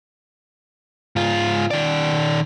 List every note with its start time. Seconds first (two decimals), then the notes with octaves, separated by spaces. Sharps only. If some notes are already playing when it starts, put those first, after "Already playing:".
1.16 G#2 F4
1.71 D#3 D5